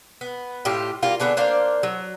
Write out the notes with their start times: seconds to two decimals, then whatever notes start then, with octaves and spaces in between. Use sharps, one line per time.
0.21 B3
0.65 A2 F4 G4
1.02 G3 A#3 F4 F5
1.20 D3 B3 D4 G#4
1.37 A#3 D4 C5 F5
1.83 F#3